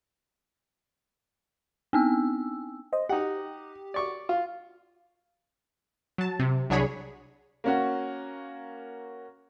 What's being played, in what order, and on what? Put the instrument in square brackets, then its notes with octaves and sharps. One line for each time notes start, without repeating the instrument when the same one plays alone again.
[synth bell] B3 C4 E6
[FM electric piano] C5 D#5
[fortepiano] D#4 F#5 [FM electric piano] G4
[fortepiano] D5 C#6 D6
F4
[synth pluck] F#3 A5
C3
C2 F#3 D4 G#4 C#5 B5
[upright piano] A#3 C#4 F#4